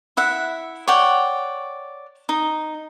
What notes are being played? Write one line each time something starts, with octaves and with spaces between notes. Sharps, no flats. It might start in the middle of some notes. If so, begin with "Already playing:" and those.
E4 E5 F#5
C#5 D5 F#5 G5
D#4